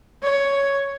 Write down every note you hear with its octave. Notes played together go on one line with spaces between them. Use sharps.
C#5